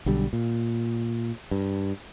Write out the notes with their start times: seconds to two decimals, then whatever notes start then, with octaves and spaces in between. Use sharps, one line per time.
0.06 B1 D3 G3
0.33 A#2
1.51 G2